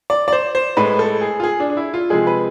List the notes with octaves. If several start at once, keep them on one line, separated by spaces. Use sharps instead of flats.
D5
D5
C5
C5
A2 G#3 B4
A4
G#4
F4
G#4
D4
D4
E4
F4
C3 F3 G#3 G#4
B4